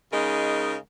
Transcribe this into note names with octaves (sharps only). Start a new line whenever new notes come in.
C#3 G#3 D#4 A#4